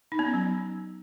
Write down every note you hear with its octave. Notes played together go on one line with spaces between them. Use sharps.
D#4
B3
C#4
F#3